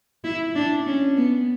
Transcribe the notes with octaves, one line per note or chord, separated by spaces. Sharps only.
E4
D4
C#4
B3